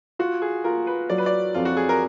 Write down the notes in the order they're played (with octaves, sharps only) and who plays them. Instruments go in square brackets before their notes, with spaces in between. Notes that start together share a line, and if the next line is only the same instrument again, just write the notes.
[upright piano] F4 [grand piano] F#4
[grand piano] G#4
[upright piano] F4 [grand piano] A#4
[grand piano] B4
[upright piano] F#3 [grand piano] D5
[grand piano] B4
D5
[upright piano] F2 [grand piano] F4
[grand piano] F#4
G#4
A#4